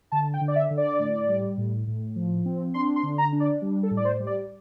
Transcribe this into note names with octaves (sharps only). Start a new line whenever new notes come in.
D3 A5
G5
D3
D5
E5
D3
D5
A2
G3
A2
A2
F3
C4
D4 C6
C6
D3
A#5
D4
D5
G3
A4
A2
D5
C5
G3
D5